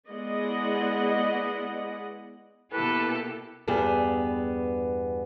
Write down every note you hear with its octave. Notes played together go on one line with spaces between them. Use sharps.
G#3 B3 E4 D5 D#5 F#5
B2 A#3 E4 G4 A4 B4
E2 G2 B3 G4 G#4